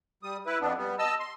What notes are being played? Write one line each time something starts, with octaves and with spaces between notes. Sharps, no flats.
G3 D#6
E4 B4
F2 B3 D4
G3 B3
D#5 A5 E6
C6